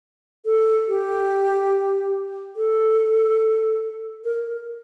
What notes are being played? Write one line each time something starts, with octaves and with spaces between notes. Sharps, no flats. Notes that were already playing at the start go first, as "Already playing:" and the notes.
A4
G4
A4
A#4